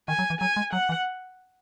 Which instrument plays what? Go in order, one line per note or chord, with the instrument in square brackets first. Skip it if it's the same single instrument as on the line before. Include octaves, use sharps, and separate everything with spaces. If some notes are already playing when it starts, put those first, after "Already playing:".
[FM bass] D#3 [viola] G#5
[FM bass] F#3
E3
[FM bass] F#3 [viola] G#5
[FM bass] G#3
[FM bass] F#3 [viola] F#5
[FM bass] E3